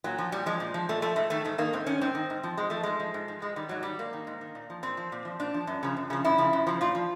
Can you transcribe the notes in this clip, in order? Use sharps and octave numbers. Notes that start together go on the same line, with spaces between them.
A#2 F#3
F3
A#2 G3
F3 G#3
A#2
F3
A#2 A3
F3 A3
G#2 A3
D#3 A3
G#2 A3
D#3 A#3
G#2 C4
D#3 C#4
G#2 C4
D#3
G#2
F3
G#2 G#3
F3 A3
G#2 G#3
F3
G#2
F3
G#2 G#3
D#3 G3
G#2 F#3
D#3 G3
G#2 A#3
D#3
G#2
D#3
A#2
F3
A#2 C4
F3
A#2
F3
A#2 D4
F3
F#2
C#3 F3
F#2
C#3 F3
F#2 E4
C#3 F3
F#2
C#3 F3
A#2 F4
F3